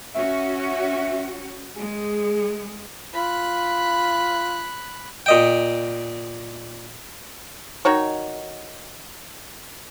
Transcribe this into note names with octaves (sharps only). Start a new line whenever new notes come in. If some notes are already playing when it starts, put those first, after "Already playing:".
C#4 F#4 E5
G#3 G#4
F4 B5 F#6
A#2 D#5 G5
D#3 D#4 F#4 C#5